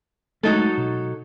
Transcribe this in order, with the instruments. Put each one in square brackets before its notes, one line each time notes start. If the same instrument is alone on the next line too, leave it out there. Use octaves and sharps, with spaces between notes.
[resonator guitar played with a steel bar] F#3 D#4 A4 [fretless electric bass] G#3 A3
[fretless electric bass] B2